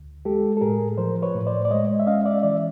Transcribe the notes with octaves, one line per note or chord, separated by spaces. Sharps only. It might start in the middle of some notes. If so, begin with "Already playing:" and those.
Already playing: D2
G#3 G4 A4
A4
A2 G#4 A#4
F3 A#4 C5
B4 C#5
A2
C5 D5
D5
G#3 C#5 D#5
E5
C#4 D#5 F5
D5 E5
E3 D5 E5